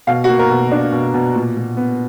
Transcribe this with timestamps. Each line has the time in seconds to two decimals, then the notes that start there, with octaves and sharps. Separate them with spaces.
0.07 B2 F5
0.24 A#3 F#4
0.39 A#4
0.50 B2
0.72 D4
0.92 B2
1.14 B2
1.35 A#2
1.57 A#2
1.77 B3